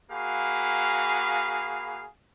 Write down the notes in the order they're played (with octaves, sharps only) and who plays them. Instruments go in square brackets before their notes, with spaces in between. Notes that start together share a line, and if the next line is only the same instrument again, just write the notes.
[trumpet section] A#3 F#4 G#4 F5 B5